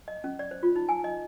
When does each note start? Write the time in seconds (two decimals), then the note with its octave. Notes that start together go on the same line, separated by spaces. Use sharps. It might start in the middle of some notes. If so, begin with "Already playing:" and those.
0.08 D#5
0.24 C#4
0.39 D5
0.51 C5
0.63 F4
0.76 D#4
0.89 G#5
1.04 D#5